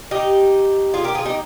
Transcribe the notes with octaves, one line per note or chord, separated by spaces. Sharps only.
D#4 G4
F4 G#4
G4 A#4
F4 G#4
D#4 G4